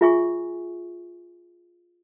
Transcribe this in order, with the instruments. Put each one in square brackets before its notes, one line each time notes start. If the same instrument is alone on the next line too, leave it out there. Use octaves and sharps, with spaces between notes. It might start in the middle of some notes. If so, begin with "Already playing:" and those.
[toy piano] F4 G#4 E5 G#5 C#6